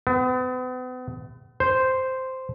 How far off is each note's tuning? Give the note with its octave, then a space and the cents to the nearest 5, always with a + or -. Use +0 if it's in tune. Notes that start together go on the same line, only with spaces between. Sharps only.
B3 +40
C5 -5